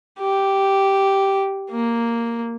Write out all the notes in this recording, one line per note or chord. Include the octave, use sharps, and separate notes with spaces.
G4
A#3